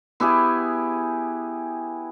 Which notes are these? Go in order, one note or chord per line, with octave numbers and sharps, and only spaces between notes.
B3 E4 G4 G#4